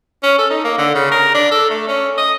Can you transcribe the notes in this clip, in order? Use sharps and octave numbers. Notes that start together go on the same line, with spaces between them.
C#4
A4
D#4
A#3
D3
C#3
A#4
D4
A4
A3
C#4
D#5